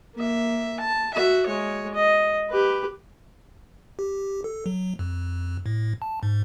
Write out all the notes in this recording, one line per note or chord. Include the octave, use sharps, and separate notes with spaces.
A#3 E5
A5
F#4 E5
G#3 C#5
D#5
G4 B4
G4
A4
F#3
F2
A2
A5
G#2